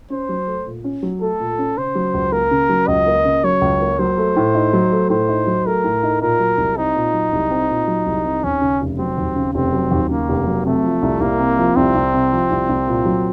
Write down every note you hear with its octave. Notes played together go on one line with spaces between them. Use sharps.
C#4 C5
F#3
A3
A#2
C#4
F#3
A3 A4
A#2
C#4
C#3 C5
F#3
C#2
A#3 A#4
C#3
F#3
C#2 D#5
A#3
C#3
F#3 C#5
C#2
A#3
F#3 C5
A3
A2
D#4
F#3
A3
A2 C5
D#4
F#3
A3 A#4
A2
D#4
A#2 A#4
F#3
C2
C4 D#4
A#2
F#3
C2
C4
A#2
F#3
C2
C4
D#2 C#4
C#3
F1
F#3 C4
D#2
C#3
F1 C4
F#3
D#2
C#3 A#3
F1
F#3
C3 A3
F3
C2
C2 A#3
C3
F3
C2 C4
C2
C3
F3
C2
C2
A#2
F#3